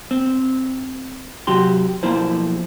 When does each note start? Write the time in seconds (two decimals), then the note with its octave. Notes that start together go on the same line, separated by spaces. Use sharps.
0.11 C4
1.47 C3 F#3 F#4 G4 C6
2.03 B1 F3 A#3 E4 C5